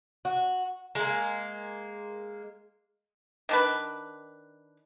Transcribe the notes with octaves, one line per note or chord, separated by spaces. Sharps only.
F#4
G#3 A#3
D#3 D4 B4